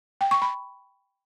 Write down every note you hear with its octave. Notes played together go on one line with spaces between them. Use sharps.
G5
C#6
B5